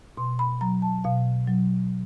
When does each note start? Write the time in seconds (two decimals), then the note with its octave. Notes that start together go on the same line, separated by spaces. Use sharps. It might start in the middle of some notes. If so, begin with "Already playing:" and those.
0.17 B2 C6
0.39 B5
0.61 F#3 A#5
0.82 A5
1.04 B2 F5
1.47 F#3